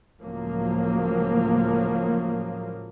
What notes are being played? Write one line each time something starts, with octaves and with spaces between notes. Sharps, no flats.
C#2 A2 F3 F#3 A#3